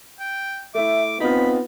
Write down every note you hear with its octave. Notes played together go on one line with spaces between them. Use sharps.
G5
A3 E4 E5 D6
B3 C4 D#4 F4 B5